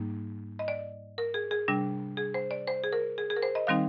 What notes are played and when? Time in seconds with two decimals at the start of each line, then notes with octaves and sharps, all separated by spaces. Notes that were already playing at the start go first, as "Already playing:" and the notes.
Already playing: G#2 G3 A#3 D#4
0.59 D#5
0.68 D5
1.18 A#4
1.34 G#4
1.51 G#4
1.68 C3 G3 D4
2.17 G#4
2.34 C5
2.51 D5
2.68 C5
2.84 G#4
2.93 A#4
3.18 G#4
3.30 G#4
3.36 A#4
3.42 C5
3.55 D#5
3.67 D#3 G3 C4 D#4 F5